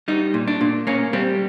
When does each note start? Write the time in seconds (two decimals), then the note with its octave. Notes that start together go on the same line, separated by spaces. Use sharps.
0.08 G3 D#4
0.34 A#2
0.48 D4
0.61 A#2
0.87 A#3 C#4
1.13 G3 C4